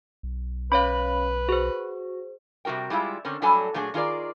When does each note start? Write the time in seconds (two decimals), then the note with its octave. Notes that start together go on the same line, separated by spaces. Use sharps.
0.23 B1
0.72 C#4 B4 C#5 F5 B5
1.49 F#4 G#4 C5
2.65 C3 G3 F#4 A#4 G5
2.90 G3 G#3 E4 F4 E5
3.25 D3 C4 C#4 A#4
3.42 A2 F#3 G3 D4 A4 G#5
3.74 A#2 F#3 A3 D4 G#4
3.94 D#3 F4 G#4 A#4 D5